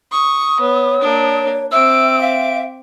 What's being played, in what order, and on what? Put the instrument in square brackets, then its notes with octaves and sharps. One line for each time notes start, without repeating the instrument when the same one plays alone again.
[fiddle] C#6 [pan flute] D#6
[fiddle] B3 [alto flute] C#5
[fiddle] A#3 D4
[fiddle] C4 D6 [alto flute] E5 [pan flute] E6
[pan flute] E5 [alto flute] F5